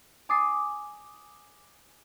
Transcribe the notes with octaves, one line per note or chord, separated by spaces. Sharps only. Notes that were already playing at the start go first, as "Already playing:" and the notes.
G#5 D6 D#6 A6 C7